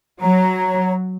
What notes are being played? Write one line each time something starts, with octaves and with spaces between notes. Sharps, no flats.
F#3 C#5 A#5